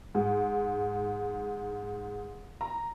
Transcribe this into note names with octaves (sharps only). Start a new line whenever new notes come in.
G#2
A#5